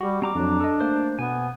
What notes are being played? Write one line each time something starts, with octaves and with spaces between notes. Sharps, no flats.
G3 F#4 G4
G3 C4 A#5 D6
F2 F#3 D4
A4 D#5
A3 A#3 C5
B2 B3 G#5